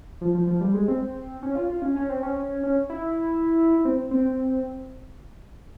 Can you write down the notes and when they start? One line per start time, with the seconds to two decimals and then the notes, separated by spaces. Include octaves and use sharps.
0.21 F3
0.34 F3
0.47 F3
0.61 G3
0.74 G#3
0.88 C4
1.43 C#4
1.55 F4
1.69 F4
1.82 C#4
1.96 C#4
2.09 C4
2.23 C#4
2.63 C#4
2.90 E4
3.85 C4
4.11 C4